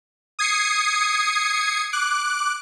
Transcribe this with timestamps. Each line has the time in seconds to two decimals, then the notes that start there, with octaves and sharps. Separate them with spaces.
0.39 D#6 G#6 C7 C#7
1.93 D6 F#6